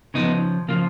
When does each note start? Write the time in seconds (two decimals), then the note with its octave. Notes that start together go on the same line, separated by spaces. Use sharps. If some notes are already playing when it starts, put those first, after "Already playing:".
0.14 C#3 F3 B3 D#4
0.68 C#3 F3 A#3